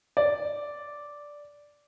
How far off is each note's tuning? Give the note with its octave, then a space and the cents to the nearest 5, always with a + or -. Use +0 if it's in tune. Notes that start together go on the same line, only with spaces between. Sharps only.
D5 -5